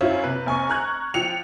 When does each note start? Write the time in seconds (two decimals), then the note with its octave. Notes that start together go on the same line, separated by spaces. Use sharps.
0.01 F#2 F#3 C#4 E4 F4
0.23 C3 B4
0.46 F1 G#5 C#6
0.69 A#5 C#6 F6 F#6 G#6
1.14 F3 G5 C#7 F7